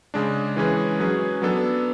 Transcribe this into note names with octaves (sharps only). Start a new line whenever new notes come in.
C#3 G#3 D4
E3 G#3 C#4 G#4 B4
F#3 C#4 G#4 B4
F#3 B3 D4 A4